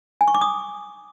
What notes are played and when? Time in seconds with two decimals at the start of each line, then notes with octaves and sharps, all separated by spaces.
0.21 G#5
0.28 C#6
0.34 D6
0.41 D#6